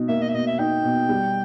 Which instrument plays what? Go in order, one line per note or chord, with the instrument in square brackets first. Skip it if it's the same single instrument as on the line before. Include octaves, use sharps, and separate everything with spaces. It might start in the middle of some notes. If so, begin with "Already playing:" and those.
Already playing: [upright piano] B2 D#4
[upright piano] A#3 [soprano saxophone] E5
[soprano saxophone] D#5
E5
[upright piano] B2 [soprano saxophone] D#5
[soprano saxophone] E5
[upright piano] D#4 [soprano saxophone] G5
[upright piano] B2
G3